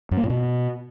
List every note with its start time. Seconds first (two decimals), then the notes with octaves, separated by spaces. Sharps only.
0.11 F#2
0.17 A#3
0.23 A2
0.30 B2